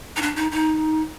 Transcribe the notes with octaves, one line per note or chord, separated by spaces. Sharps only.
D#4
D4
D#4
D#4